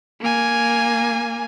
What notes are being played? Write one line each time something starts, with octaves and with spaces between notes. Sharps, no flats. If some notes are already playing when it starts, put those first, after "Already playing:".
A#3 G#5